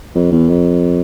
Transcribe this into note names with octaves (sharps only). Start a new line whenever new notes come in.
F2
E2
F2